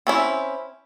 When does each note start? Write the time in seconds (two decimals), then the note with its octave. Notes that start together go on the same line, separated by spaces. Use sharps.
0.07 C4 C#4 E4